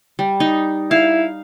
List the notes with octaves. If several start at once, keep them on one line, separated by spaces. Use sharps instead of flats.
G3
D#4
E4 F5